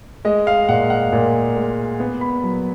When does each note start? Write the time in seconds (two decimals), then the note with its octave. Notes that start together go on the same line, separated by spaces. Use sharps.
0.25 G#3 D#5
0.47 F5
0.69 A#2 F#5
0.90 F#5
1.12 A#2
1.56 G#3
2.00 B3
2.21 B5
2.43 F#3